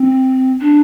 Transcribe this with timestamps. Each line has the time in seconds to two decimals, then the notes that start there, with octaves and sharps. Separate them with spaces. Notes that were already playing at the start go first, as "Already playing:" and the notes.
Already playing: C4
0.60 D4